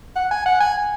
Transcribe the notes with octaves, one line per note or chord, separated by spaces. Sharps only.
F#5
G#5
F#5
G#5